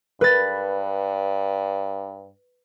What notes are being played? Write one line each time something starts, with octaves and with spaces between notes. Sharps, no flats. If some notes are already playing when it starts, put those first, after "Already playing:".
G2 B4 A6